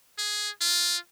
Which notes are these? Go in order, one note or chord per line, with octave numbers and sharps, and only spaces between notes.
G#4
F4